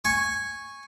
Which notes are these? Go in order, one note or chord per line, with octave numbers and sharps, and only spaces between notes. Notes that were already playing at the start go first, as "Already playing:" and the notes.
G#5 C#6